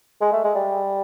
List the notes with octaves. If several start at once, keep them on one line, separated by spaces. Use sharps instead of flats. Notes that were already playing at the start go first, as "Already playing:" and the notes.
G#3
A3
G#3
G3